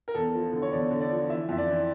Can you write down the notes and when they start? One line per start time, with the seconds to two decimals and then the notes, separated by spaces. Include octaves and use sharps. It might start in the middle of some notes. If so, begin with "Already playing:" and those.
0.08 A#4
0.15 E2 A4
0.34 F3
0.53 D3
0.62 C#5
0.72 E2 D5
0.91 D3
1.01 D5
1.11 F3
1.30 E3 E5
1.49 F2 E5
1.58 D5
1.68 E3